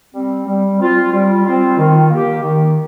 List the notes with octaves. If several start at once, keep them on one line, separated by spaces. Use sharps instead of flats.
G3 C4
G3
C4 F4
G3
C4 F4
D#3
A#3 G4
D#3